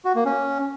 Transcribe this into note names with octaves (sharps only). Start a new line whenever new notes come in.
F#4
A#3
C#4